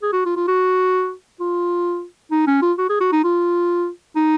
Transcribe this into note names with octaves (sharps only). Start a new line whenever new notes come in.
G#4
F#4
F4
F4
F#4
F4
D#4
C#4
F4
F#4
G#4
F#4
D#4
F4
D#4